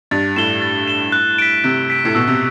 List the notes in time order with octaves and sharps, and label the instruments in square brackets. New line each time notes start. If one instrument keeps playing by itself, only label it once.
[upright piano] G2 [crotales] A6
[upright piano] A2 [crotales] E7 G7
[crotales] A6
E7 G7
F#6
B6 D7
[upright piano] C3 [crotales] F#6
[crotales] B6 D7
[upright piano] A2
[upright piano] B2 [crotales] E6
[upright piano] C3